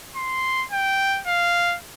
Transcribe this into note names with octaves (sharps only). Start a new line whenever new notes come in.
C6
G5
F5